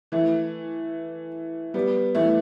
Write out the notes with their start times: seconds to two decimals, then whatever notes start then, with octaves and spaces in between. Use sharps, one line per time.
0.12 E3 A3
1.74 G3 B3
2.15 E3 A3